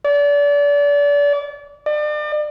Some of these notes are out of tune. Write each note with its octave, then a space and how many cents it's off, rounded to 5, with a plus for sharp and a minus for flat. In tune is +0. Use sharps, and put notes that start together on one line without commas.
D5 -30
D5 +40